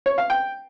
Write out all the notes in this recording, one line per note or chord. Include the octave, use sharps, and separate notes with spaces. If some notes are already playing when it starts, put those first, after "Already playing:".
C#5
F5
G5